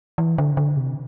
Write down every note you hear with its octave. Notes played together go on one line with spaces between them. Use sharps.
E3
D3
D3
C3